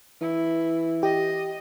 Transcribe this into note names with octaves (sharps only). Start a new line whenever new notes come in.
E3 E4
G4 D#5